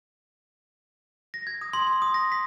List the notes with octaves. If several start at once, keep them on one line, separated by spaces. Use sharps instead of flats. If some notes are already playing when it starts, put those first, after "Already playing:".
A#6
G#6
D#6
C6
C6
D#6
A#6
B6